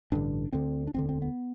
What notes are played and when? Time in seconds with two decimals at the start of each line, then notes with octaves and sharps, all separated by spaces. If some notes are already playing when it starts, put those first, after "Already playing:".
0.12 A1 G2 D3 D4
0.52 D2 D3 C4
0.87 D4
0.94 E1 D2 D3 C4
1.09 C4
1.22 B3